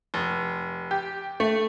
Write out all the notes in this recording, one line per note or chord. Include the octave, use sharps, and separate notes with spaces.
F1
G4
A3